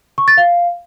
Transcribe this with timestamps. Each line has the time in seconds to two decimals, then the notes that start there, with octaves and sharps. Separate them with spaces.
0.18 C#6
0.28 A6
0.37 F5